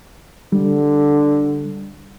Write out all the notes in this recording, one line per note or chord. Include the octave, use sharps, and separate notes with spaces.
D3 G3